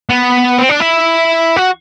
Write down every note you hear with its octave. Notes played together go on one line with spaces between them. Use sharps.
B3
C4
D4
E4
F#4